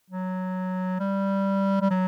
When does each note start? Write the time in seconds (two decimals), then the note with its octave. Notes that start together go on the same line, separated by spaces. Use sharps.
0.10 F#3
1.00 G3
1.81 G3
1.90 F#3